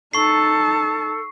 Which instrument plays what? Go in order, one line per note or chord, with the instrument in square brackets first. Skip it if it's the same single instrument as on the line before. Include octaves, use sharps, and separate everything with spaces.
[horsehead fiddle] D#4 A5 [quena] A4 [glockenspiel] C#6 C7